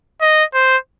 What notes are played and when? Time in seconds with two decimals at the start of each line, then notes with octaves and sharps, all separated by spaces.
0.21 D#5
0.54 C5